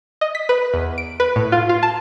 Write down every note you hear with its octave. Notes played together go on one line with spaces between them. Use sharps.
D#5
B6
B4
E2
D7
B4
A2
F4
F4
A5